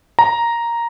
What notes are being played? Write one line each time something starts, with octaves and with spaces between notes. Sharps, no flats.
A#5